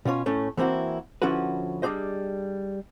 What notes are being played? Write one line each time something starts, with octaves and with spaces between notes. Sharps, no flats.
B2 C#4 F4 C#5
A2 A3 C#4
E3 A#3 C4 E4 F#4
D3 F3 C#4 E4 F#4 B4
G3 D4 G4 G#4 C5 D#5